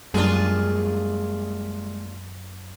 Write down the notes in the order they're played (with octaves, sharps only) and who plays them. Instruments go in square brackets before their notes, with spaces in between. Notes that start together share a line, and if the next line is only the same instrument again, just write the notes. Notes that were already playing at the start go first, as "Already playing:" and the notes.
[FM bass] F#2 [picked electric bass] G3 G#3 A#3 [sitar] D4 F4 G#4